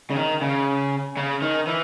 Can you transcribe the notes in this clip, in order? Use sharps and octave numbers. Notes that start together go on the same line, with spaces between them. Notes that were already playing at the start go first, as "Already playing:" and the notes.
C#3
D#3
C#3
C#3
D#3
E3